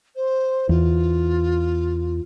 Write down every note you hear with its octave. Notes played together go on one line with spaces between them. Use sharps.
C5
E2 F4